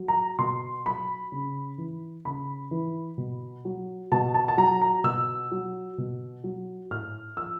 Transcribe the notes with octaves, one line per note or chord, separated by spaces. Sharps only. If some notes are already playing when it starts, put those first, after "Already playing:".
Already playing: F#3
A#5
B2 C6
F#3 B5
C#3
E3
C#3 B5
E3
B2
F#3
B2 A5
A5
A5
F#3 A#5
A#5
B2 E6
F#3
B2
F#3
A2 F6
F3 E6